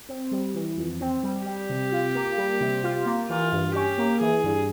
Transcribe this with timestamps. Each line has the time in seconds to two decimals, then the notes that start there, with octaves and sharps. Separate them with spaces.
0.09 C4
0.31 G3
0.55 E3
0.77 F2
1.01 C4
1.23 G3
1.46 G3 G4
1.69 C3
1.92 F4
2.15 A#3
2.38 G3
2.61 C3
2.84 F4
3.06 A#3
3.29 E3 F4
3.52 G2
3.75 C#4 G4
3.98 A#3
4.21 E3 G#4
4.44 G2